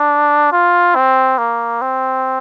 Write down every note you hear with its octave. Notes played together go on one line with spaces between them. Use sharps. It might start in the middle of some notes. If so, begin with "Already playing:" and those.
Already playing: D4
F4
C4
A#3
C4